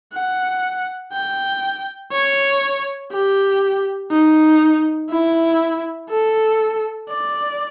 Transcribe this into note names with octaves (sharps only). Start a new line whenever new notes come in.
F#5
G5
C#5
G4
D#4
E4
A4
D5